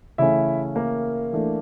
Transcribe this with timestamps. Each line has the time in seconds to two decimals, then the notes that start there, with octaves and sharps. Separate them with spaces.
0.18 C#3 E3 A3 C#4 E4 E5
0.76 A#3 A#4
1.32 E3 A3 D4